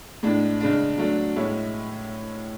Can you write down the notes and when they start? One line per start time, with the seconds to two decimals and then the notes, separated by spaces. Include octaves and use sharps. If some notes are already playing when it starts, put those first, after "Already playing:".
0.23 A2 G#3 D4
0.61 C#3 G#3 D4
0.98 F#3 A3 D4
1.36 A2 G#3 C#4 E4